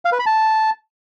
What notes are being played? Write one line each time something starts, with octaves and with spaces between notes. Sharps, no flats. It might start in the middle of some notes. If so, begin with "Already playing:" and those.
F5
B4
B5
A5